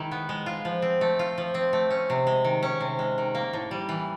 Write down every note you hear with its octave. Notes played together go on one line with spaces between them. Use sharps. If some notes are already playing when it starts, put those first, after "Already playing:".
Already playing: D#3 G#3 E4
B3
G#3
F4
F3
C4
A3
F4
F3
C4
A3
C#4
C3
G#3
D#3
C#4
C3
G#3
D#3
A#3
A2
G3
E3